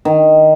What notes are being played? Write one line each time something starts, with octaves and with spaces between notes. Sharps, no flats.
D#3